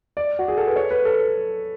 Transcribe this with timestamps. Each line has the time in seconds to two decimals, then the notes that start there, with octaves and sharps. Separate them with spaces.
0.17 D5
0.39 F#4
0.48 G#4
0.58 A4
0.67 B4
0.76 C#5
0.91 B4
1.05 A4